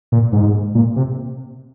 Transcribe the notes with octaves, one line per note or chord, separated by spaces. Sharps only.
A#2
G#2
A#2
C3